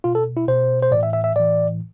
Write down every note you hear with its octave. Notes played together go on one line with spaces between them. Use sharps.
B2 F4
A4
E4
B2 C5
C5
A2 E3 D5
E5
E5
E5
A2 E3 D5